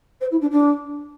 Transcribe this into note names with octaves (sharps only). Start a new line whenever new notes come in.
C5
E4
D4
D4